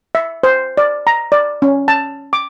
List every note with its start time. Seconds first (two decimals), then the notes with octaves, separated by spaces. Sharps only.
0.15 E5
0.43 C5
0.77 D5
1.07 A#5
1.32 D5
1.62 C#4
1.88 A5
2.33 D6